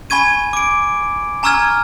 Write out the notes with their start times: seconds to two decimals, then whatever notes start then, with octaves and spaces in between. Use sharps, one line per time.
0.10 G#5 B5 C#6 G#6 D#7
0.53 D6 D7
1.43 G#5 A#5 C#6 E6 F6 G#6